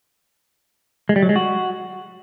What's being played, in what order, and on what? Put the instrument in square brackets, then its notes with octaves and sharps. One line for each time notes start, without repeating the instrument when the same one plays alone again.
[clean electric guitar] G#3
G3
F#3
G#3
F#4